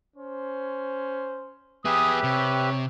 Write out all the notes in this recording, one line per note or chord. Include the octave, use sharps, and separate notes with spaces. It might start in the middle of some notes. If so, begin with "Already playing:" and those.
C#4 C5
B3 G4 G#4 B4 E5 D#6
C3 C#5